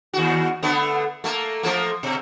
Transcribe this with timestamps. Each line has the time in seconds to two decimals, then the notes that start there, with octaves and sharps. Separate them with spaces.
0.13 D#2 F#4
0.62 D3 A3 B3
1.24 A3 A#3
1.63 F3 A3 A#3
2.03 B2